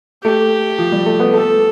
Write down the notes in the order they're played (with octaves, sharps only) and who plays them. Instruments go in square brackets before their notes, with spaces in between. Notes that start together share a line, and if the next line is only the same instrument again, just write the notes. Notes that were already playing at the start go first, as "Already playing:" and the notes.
[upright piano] A3 [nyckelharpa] G4
[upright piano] F3
G3
A3
B3
[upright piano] A3 [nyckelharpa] A4